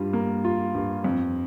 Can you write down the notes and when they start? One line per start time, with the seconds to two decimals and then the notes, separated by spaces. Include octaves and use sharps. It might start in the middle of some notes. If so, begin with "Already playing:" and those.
Already playing: G2 G3 F4
0.13 A#3
0.44 F4
0.75 G2
1.04 F2